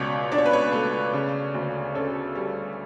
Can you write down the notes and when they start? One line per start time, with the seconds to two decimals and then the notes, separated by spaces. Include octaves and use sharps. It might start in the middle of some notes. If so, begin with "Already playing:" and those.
Already playing: C#2 B2 C#5 D5
0.32 D4 D5
0.38 C#5
0.46 B4
0.53 C#5
0.72 A3
1.13 C#3
1.54 D2
1.95 C#4 A4
2.35 G3